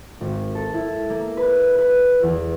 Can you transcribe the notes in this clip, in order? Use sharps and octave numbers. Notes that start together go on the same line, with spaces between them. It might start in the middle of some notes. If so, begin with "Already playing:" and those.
G#1
A4
E4
A#3
B4
B4
E2